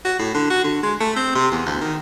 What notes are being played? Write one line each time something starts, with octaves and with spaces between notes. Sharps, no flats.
F#4
A2
D3
F#4
D3
G#3
A3
C4
C3
E2
D2
D#3